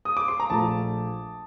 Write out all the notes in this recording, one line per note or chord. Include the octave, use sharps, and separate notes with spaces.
D#6
D6
C6
A#5
A#1 A#2 A3 A5